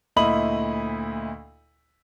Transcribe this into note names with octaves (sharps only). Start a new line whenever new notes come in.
D2 A#2 E4 D#5 B5 F#7